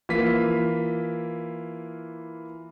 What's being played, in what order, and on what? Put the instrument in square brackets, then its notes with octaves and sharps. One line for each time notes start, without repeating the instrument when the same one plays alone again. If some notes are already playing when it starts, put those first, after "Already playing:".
[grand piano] E3 A#3 F4 B6